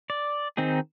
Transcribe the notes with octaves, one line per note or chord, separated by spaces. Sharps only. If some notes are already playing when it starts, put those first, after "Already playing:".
D5
D#3 C4 D#4 G#4